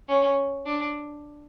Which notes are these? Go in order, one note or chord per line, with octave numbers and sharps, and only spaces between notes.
C#4
D4